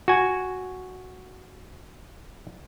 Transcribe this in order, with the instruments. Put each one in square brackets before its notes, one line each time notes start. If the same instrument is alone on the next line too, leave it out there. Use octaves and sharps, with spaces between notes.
[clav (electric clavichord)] F#4 G#5